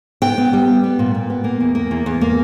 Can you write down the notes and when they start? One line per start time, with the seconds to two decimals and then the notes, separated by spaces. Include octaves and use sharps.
0.22 B3 G5
0.38 B3
0.53 G3
0.68 B3
0.84 B3
0.99 A#2
1.15 A#2
1.30 B3
1.44 A#3
1.60 E2
1.75 A#3
1.91 E2
2.06 E2
2.21 A#3